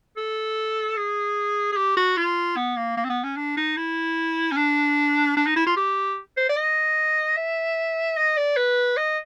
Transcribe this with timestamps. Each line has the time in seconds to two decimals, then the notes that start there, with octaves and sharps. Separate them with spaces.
0.17 A4
0.97 G#4
1.72 G#4
1.77 G4
1.97 F#4
2.17 F4
2.57 B3
2.77 A#3
2.97 A#3
3.05 C4
3.10 B3
3.24 C#4
3.37 D4
3.57 D#4
3.77 E4
4.52 C#4
4.57 D4
5.37 D4
5.47 D#4
5.57 E4
5.67 F4
5.77 G4
6.37 C5
6.49 D5
6.57 D#5
7.37 E5
8.17 D#5
8.37 D5
8.57 B4
8.97 D#5